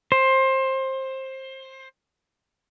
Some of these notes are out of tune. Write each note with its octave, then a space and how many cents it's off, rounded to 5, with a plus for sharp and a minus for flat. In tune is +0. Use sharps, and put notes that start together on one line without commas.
C5 +20